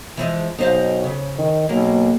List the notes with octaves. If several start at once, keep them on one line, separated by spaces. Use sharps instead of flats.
E3 F3 G#3
B1 D#4 C5 F5
C#3
D#3
B1 A#3